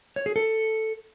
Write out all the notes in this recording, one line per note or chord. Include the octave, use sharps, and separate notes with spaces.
C#5
G#4
A4